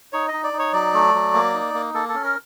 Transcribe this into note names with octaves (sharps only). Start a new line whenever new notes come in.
D#4 C#5
D#5
D#4
D5
D#4
C#5
F#3 D5
A3
F#3
A#3
D#4
A#3
A#3 A4
A4
C#4
A#4